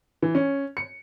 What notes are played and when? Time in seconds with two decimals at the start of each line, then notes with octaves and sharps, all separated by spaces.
0.22 E3
0.35 C#4
0.77 C#7